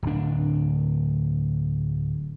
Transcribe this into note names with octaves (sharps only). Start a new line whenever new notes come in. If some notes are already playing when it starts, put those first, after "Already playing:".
D1 D4